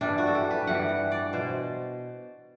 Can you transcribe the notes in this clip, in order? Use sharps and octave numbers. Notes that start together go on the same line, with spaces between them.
G2 E3 G3 D4
F#4
A4
G4
B4
G2 E3 G3 F#5
F#5
D5
B2 C5